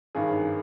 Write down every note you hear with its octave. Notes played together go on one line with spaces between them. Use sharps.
G#1 G2 D#3 G#4